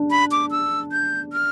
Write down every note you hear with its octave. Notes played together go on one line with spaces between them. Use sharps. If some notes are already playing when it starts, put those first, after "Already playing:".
Already playing: D4
B5
D6
E6
G6
F6